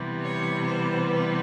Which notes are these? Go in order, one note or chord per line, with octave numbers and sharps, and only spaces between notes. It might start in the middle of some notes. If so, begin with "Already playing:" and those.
Already playing: C3 E3 G3 B3
C#5
C5
B4